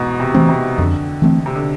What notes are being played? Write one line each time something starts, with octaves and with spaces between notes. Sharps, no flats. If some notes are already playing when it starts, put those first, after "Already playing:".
Already playing: E2 G#2 B2
C3
E3 A3 C4
C3
F2 D3
E3 A3 C4
C3
D3